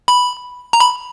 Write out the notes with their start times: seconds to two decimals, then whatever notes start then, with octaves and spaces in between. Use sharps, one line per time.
0.08 B5
0.73 A#5
0.80 B5